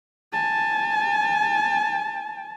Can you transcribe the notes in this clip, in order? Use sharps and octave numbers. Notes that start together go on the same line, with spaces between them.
G#5 A5